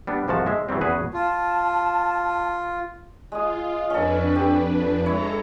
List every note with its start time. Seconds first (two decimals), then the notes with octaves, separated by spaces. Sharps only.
0.07 G3 B3 D4
0.28 C2 G#2 F3 F#4 A5
0.46 G#3 E5
0.69 E3 F#3 G3 C4
0.81 E2 C#4 F#4 G#4 B4
1.14 F4 A5
3.32 G#3 F4 D#6
3.90 F2 C#4 D4 A4 B4
4.35 G4
5.06 G#3 E4 A4 C#5 A#5